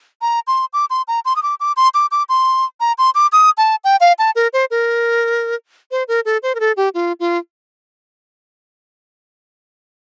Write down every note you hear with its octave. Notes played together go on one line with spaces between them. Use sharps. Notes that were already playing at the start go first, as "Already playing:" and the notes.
A#5
C6
D6
C6
A#5
C6
D#6
D6
D6
C6
D6
D6
C6
A#5
C6
D6
D#6
A5
G5
F5
A5
A#4
C5
A#4
C5
A#4
A4
C5
A#4
A4
G4
F4
F4